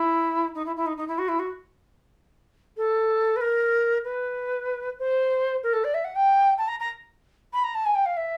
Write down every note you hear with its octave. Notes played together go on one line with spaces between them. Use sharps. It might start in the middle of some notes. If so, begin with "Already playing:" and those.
Already playing: E4
D#4
E4
E4
D#4
D#4
E4
F#4
E4
F#4
A4
B4
A#4
B4
C5
A#4
A4
D5
E5
F#5
G5
A5
A#5
A#5
B5
A#5
A5
G#5
G5
F5
E5